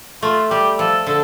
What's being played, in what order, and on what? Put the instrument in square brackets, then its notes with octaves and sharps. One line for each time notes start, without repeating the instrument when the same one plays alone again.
[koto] A3 [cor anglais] F4
[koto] G3 [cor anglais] G4
[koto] F3 [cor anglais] A4
[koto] D3 [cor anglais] A4